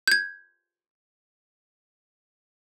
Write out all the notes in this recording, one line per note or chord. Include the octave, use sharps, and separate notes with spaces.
G6 G#6